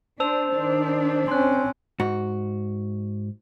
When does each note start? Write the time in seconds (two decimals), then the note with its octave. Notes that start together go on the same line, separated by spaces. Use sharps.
0.20 D4 C5 A5 E6 F7
0.54 D#3 D4
1.28 C4 C#4 C6 F#6
2.00 G#2 F#4